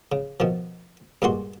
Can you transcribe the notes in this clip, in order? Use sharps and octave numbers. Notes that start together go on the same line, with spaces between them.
C#3
B2 D#3 F3
G2 A#2 G#3 F#4 C6